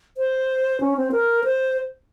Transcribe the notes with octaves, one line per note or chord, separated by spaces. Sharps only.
C5
C#4
C4
A#4
C5